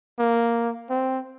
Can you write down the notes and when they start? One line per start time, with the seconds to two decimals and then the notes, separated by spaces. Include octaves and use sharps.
0.19 A#3
0.90 C4